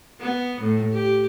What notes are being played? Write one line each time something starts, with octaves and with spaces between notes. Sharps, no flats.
B3
A2
G4